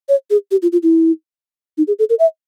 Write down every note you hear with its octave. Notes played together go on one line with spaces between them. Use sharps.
C#5
G#4
G4
F4
F4
E4
D#4
G#4
A4
A#4
E5